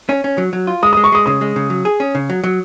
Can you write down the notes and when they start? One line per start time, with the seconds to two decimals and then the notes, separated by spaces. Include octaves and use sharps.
0.09 C#4
0.24 C#4
0.38 F#3
0.53 F#3
0.67 F4
0.83 G#3 D#6
0.93 G#3 D#6
1.04 C#6
1.12 G#3 D#6
1.26 C#3 D#6
1.41 G#3
1.56 C#3
1.70 F#3
1.85 G#4
2.00 C#4
2.15 C#3
2.30 F#3
2.44 F#3